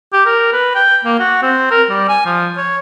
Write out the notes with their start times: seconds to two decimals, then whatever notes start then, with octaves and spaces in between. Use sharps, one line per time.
0.13 G4
0.26 A#4
0.53 B4
0.75 G5
1.05 A#3
1.20 F#4
1.42 C4
1.71 A#4
1.90 G3
2.09 G#5
2.26 F3
2.57 C#5